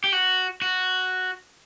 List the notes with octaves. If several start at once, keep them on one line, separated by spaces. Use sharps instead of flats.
G4
F#4
F#4